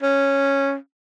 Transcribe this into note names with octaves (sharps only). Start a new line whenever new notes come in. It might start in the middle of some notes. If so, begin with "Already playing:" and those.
C#4